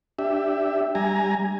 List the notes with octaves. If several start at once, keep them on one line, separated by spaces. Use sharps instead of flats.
D4 G4 E5
G3 G#5 A#5